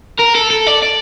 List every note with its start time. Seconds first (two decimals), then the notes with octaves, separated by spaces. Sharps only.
0.19 A#4
0.35 A4
0.50 A4
0.67 D5
0.82 D5